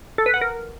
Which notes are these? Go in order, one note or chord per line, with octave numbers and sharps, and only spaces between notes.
A4
B4
F#5
A#4